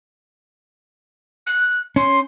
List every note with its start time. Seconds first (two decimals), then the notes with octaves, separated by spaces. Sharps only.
1.46 F#6
1.96 C#4 C6